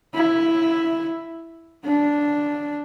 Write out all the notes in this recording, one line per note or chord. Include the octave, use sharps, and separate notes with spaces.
E4
D4